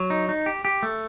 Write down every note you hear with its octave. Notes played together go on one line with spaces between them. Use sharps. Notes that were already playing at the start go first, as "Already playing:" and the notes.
Already playing: F#3
D#4
D#4
G4
G4
A3